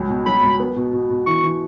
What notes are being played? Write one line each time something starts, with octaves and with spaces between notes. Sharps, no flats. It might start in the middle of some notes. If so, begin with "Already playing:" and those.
Already playing: C#2 F#3
B2
F#3 B5
C#2
B3
B2
B2
B2
E3 C#6
E3